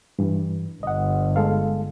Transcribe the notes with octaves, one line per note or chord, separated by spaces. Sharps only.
G2 E3
G1 D#5 F#5
G#3 A4 F5